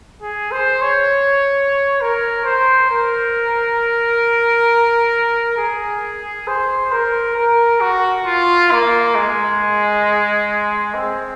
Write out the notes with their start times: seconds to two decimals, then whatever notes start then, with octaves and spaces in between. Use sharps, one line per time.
0.22 G#4
0.52 C5
0.82 C#5
2.01 A#4
2.45 C5
2.90 A#4
5.58 G#4
6.47 C5
6.92 A#4
7.36 A#4
7.81 F#4
8.26 F4
8.71 A#3
9.15 G#3
10.94 C4